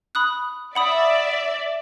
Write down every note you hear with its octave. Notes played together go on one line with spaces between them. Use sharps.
B5 D#6 F#6
D5 E5 F#5 B5 D#6